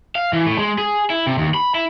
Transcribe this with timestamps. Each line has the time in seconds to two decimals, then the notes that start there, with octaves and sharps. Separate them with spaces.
0.15 F5
0.33 E3
0.46 A2
0.58 G#3
0.78 G#4
1.10 E4
1.27 C3
1.38 D#2
1.54 B5
1.75 E4